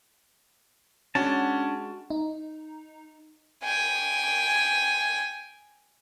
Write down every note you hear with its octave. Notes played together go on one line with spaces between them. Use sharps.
G#3 C#4 D4 F#4 A5
D#4
G5 G#5